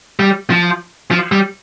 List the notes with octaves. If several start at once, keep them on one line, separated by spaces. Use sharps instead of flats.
G3
F3
F3
G3